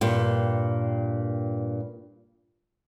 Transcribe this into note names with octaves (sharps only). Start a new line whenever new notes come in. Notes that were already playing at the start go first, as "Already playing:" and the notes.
G2 A#2